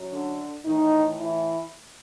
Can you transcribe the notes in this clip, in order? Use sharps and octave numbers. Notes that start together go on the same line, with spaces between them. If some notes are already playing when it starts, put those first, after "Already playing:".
Already playing: F#2 F#3
D3 D4
A2 D#3 E3 D#4
E3 E4